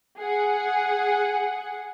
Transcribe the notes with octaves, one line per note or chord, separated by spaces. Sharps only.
G#4 F#5